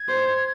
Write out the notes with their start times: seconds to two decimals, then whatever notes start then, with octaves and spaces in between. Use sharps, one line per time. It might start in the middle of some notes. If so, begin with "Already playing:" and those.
Already playing: G#6
0.08 C5